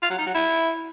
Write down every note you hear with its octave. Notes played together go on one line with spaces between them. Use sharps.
F4
F#3
D#4
F#3
E4